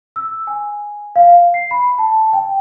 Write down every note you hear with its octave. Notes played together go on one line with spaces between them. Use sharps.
E6
G#5
F5
C7
B5
A5
G5